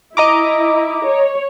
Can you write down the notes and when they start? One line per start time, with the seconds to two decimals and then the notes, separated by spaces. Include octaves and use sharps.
0.17 E4 D#5 A#5 D6
1.08 C#5